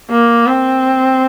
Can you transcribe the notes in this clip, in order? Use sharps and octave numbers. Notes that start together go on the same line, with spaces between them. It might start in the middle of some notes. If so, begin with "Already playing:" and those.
A#3
C4